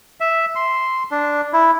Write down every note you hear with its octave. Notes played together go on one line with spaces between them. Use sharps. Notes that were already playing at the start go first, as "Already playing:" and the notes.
E5
C6
D4
E4